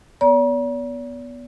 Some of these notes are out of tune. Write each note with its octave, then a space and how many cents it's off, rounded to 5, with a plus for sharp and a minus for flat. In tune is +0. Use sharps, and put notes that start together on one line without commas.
B3 -5 D5 -45 A#5 +40